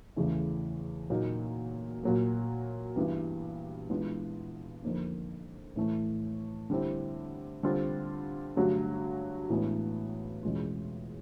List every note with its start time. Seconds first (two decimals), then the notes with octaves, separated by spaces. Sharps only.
0.16 E2 C#3 E3 A3
1.10 A#2 F#3 A#3 D#4
2.03 A#2 F#3 A#3
2.96 G2 E3 G3 B3
3.90 E3 G#3 B3 D4 F4
4.83 F2 D3 F3 A#3 D#4
5.76 A2 E3 A3
6.70 D3 G3 C4 E4
7.63 D3 G3 C4 F4
8.56 G2 D3 F#3 A3
9.50 A2 E3 G#3 B3 D4
10.43 E2 B2 G#3 C#4 F4